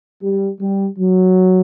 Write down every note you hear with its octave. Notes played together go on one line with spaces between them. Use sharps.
G3
G3
F#3